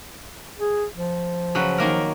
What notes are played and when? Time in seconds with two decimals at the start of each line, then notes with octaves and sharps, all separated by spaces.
0.60 G#4
0.95 F3
1.55 C#3 F#3 B4
1.78 D#3 A#3 A#4